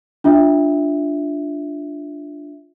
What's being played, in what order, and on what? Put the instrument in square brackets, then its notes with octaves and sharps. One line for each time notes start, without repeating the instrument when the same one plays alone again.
[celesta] D4 F4 E5